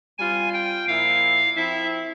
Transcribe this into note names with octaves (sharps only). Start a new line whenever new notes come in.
G3 C4 F4 G#5
G5
A#2 F3 A#3 E4 F5
F3 C4 E4 E5